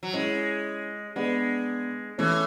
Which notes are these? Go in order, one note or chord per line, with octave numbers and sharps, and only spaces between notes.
F#3
G#3 C#4 E4
G#3 B3 D4
E3 A3 C#4